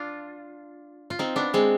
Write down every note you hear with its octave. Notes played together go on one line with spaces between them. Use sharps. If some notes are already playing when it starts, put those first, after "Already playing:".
Already playing: D4 F4
F4
C4 D#4
B3 D4
G#3 C4